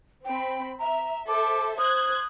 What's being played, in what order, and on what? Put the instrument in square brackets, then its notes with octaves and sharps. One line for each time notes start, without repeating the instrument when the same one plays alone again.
[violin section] C4 B5 [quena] G5
[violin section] E5 [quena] A#5
[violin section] A4 C5 E5 [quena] D6
[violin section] C5 F#6 G#6 [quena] D#6